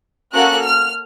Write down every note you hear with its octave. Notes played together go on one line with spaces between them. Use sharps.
A#3 C#4 F#4 A4 F#6
F6